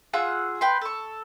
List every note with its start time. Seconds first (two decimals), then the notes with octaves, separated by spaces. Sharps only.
0.13 F4 G#4 F#5 E6
0.61 B4 G5 C6
0.81 A4 C#6